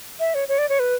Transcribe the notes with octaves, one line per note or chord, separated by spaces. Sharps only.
E5
C#5
C#5
D5
C#5
B4